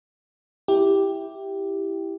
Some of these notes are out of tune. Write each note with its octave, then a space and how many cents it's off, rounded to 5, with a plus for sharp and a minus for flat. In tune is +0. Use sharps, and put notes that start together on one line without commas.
E4 +0 G4 +0